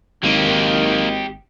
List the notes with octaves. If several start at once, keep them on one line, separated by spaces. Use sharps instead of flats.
G#1 D#3 F#3 A#3 G4 D#5